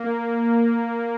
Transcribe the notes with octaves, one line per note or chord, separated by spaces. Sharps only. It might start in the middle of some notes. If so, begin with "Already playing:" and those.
Already playing: A#3